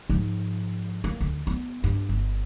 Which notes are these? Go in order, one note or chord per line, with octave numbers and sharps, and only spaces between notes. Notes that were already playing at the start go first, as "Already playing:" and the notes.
G#2 F3
A#3
D2
B3
G2
G1